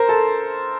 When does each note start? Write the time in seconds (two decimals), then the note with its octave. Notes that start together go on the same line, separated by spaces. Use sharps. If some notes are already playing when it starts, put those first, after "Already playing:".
Already playing: A#4 C5
0.09 A4